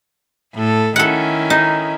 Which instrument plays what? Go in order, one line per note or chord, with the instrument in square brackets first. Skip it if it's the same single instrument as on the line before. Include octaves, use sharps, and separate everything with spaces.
[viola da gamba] A2 A4
[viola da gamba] D#3 C#4 E4 [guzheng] A4 F#5
[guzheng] D#4